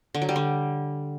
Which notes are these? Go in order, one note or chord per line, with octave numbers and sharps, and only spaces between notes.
D3
F#3
G3
D3